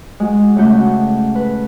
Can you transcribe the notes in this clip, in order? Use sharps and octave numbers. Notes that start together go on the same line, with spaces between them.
G#3 F#4
C#3 A3 F#4 G6
B4